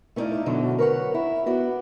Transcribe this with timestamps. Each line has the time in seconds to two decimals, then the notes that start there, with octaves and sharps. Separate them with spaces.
0.16 A3 B3 D#4 E4 D5 F5
0.46 F#2 B2 D3 F#3
0.78 A#4 B4 C#5 D5 F#5
1.14 E4
1.46 B3 F#4 D5